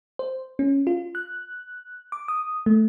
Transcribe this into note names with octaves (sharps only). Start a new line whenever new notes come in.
C5
C#4
F4
F#6
D6
D#6
A3